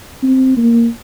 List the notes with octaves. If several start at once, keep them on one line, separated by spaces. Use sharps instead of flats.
C4
A#3